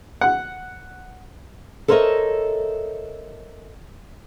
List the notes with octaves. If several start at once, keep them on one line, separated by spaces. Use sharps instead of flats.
F#5
A4 A#4 C5 C#5 D#5 E5